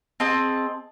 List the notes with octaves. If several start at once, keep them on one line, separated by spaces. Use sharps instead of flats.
C4 G#4 D#5 A5